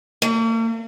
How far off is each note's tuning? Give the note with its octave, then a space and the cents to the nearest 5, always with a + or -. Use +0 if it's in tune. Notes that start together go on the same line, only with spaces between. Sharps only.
A#3 -45